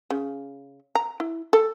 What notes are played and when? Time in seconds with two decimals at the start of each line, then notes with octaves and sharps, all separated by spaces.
0.10 C#3
0.95 A#5
1.20 E4
1.53 A4